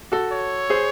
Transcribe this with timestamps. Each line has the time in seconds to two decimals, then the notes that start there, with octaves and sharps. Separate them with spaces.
0.12 F#4 A4
0.31 C#5
0.70 G#4 C5